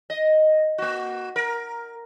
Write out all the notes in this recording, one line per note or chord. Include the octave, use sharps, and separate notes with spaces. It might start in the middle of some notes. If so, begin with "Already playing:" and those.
D#5
A#3 F#4
A#4